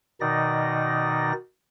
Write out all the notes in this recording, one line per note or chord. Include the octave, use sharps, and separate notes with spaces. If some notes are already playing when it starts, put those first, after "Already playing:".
B2 D#3 D#4 D5 A#6